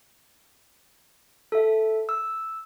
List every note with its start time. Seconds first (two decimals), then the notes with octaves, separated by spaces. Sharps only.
1.52 A4 E5
2.09 E6